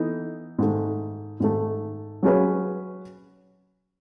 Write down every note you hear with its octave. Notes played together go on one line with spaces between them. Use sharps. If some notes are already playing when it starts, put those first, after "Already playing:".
Already playing: E3 B3 D#4 A4
G#2 D#3 A3
G#2 D#3 A3
F#3 C#4 G#4 B4